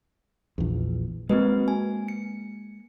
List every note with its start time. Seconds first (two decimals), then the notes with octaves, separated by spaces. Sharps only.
0.58 A#1 E2
1.29 G#3 A#3 C4 F#4 B4
1.68 G#5
2.08 C#7